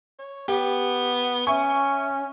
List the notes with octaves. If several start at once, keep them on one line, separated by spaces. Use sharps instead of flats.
C#5
B3 G4
C#4 E5 G#5 C#6